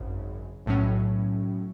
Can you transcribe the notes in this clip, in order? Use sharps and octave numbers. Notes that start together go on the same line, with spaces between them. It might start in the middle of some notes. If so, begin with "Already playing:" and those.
Already playing: G#1 F#2 C#3
B1 A2 F#3 C#4